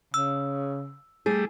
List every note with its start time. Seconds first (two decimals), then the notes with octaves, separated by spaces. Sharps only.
0.14 C#3 E6
1.26 G3 A3 G#4